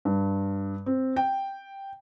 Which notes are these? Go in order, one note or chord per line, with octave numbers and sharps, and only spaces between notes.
G2
C4
G5